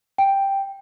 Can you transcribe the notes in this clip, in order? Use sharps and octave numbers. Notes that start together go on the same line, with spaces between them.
G5